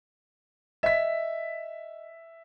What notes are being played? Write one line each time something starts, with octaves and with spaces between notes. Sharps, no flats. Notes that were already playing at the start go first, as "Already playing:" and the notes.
D#5 E5 B6